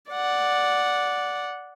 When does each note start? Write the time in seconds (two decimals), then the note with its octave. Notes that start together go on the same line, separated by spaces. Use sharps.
0.11 D5 F#5